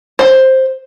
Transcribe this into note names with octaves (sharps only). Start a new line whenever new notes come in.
C5